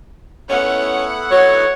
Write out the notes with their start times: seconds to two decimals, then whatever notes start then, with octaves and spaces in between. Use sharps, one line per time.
0.50 A3 B3 C#4 E4 F#5
1.31 F#3 C#5